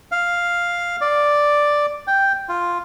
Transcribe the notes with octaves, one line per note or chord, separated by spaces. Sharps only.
F5
D5
G5
F4